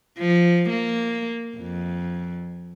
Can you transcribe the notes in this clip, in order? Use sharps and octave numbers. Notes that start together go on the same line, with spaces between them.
F3
A#3
F2